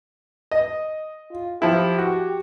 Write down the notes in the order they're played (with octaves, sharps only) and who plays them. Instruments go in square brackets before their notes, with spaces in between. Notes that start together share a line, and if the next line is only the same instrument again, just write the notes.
[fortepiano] D#5
[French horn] F4
[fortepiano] F3 E4 [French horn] G4
[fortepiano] F#4